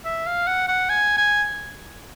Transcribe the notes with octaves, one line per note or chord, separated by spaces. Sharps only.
E5
F5
F#5
F#5
G#5
G#5